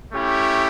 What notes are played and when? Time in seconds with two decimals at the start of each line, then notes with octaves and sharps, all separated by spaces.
0.13 A3 C#4 E4 G4